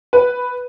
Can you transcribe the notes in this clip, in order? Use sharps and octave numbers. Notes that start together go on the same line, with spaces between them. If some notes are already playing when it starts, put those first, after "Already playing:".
B4